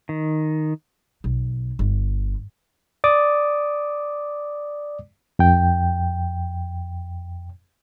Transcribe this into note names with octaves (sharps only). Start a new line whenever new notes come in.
D#3
B1
G1
D5 D6 D#6
F2 G5